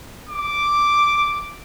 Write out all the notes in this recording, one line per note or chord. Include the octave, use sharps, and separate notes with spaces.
D6